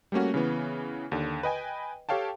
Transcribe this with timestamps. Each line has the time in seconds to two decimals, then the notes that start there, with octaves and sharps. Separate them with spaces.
0.12 G3 A3 A#3 C#4 F#4
0.34 C#3 E3 B3
1.12 D#2 D3
1.43 B4 D#5 G5 G#5
2.09 G4 A4 C#5 F5 G5 A5